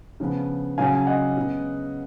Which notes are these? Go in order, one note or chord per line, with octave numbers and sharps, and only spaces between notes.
C#3 F3 B3
C#3 F#3 C#4 F5 G#5
G#5
D#5 F#5
C#3 G#3 B3